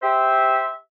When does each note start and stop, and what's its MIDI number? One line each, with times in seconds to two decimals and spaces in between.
0.03 0.71 67
0.03 0.71 72
0.03 0.71 76